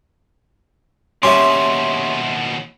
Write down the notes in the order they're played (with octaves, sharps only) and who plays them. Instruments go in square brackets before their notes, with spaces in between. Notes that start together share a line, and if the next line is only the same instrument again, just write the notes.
[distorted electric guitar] D#2 B2 [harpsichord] C#4 G4 [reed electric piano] E5 C6